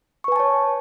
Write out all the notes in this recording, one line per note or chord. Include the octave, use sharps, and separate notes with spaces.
B4 C#5 G#5 A5 C#6